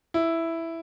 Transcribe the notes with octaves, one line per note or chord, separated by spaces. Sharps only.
E4